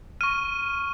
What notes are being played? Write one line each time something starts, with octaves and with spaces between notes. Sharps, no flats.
C#6 F6 D#7